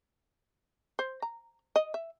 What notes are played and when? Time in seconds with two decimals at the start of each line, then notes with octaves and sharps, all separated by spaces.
0.99 C5
1.22 A#5
1.76 D#5
1.94 E5